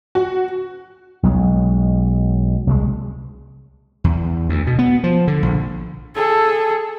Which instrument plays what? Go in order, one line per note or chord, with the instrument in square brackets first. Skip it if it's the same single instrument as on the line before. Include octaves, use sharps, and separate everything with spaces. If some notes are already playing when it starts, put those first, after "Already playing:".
[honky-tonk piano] F#4
[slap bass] B1 F#3 G#3
C2 F#3 G#3
E2
D2
B2
B3
F3
D3
A#1
[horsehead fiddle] G#4 A4